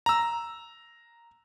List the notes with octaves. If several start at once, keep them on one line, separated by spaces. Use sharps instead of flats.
A#5 E6